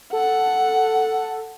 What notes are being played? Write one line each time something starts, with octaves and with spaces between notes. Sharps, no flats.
A4 F#5